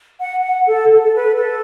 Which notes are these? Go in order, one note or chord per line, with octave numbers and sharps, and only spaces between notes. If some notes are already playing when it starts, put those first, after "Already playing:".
F#5
F#5
A4
A4
A4
B4
A4